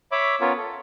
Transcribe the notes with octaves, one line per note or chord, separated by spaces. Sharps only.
C#5 E5 B5 D6
B3 C#4 F4 A#4 C#5
A4